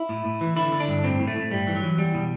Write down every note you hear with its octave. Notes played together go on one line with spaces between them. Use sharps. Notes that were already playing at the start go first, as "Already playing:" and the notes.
Already playing: E4
A2
A2
E3
D3 E4
D3
D4
G2
A2 C4
A2
A3
A2
G2 G3
E3
F#3
E3
E2 G3
B2